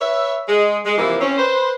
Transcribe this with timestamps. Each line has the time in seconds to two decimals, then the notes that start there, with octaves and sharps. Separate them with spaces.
0.01 B4 C#5 E5
0.48 G#3
0.85 G#3
0.98 C3 E3 F3 A#3 E4
1.20 C4 C#4
1.38 B4 C5